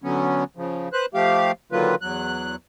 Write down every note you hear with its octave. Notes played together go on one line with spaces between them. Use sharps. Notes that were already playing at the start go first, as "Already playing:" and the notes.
D3 F#3 B3 C#4
C#3 F3
B4 C5 F#6
F3 A3 G4 F5
D3 D#3 F#3 A#3 F4 B4
E2 F#3 F#6